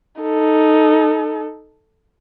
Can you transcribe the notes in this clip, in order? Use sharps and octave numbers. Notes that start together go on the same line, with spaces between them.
D#4 A4